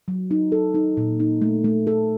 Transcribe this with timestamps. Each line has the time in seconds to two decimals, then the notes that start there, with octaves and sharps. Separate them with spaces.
0.08 F#3
0.31 D#4
0.52 A4
0.74 D#4
0.97 A#2
1.20 D#4
1.42 A3
1.64 A3
1.87 A4